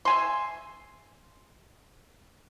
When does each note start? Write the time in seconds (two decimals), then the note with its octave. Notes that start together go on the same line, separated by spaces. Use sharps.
0.05 E5 G#5 C6